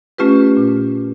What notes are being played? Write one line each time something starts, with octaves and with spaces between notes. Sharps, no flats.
A3 C#4 F4 G4 B4
A#2